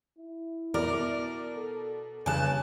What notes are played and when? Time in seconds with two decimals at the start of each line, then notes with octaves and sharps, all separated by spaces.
0.17 E4
0.74 B2 A#4 D5
1.57 A4
2.26 G2 C#3 G#5 A5 F#6